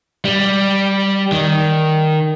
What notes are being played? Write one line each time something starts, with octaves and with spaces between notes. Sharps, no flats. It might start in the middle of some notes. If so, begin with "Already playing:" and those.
G3
D#3